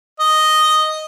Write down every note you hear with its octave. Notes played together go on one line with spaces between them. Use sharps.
D#5